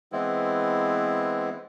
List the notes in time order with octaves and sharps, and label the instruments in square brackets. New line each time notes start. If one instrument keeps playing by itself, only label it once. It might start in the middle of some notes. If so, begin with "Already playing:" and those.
[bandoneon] E3 G#3 B3 C4 E4